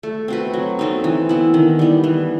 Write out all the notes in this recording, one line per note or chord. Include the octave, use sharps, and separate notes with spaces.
A3
C4 F#4 B4
F#3
A3 C4 D#4
E3
B3 E4
D#3
G3 B3
E3